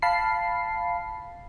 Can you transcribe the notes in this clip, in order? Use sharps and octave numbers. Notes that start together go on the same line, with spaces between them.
F5 A5 B5 C7